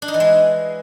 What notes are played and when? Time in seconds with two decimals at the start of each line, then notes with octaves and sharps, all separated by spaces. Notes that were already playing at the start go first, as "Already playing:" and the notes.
0.02 D4
0.08 D#4
0.14 E3
0.20 G#3